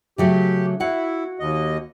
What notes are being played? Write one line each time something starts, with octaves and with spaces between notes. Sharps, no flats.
C#3 F#3 A3 G4
E4 F#4 F5 F#5
D#2 D#5